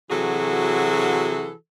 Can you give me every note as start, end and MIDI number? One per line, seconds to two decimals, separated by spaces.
0.11 1.51 48
0.11 1.51 52
0.11 1.51 54
0.11 1.51 66
0.11 1.51 68
0.11 1.51 69